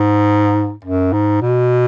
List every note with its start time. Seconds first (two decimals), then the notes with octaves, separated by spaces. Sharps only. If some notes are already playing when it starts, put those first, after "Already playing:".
Already playing: G#2
0.85 F#2
1.13 G#2
1.41 B2